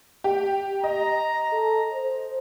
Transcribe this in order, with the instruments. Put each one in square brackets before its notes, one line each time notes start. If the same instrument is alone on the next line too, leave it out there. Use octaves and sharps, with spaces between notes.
[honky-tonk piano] G4
[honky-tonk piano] D#5 [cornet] A#5
[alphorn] A4
C5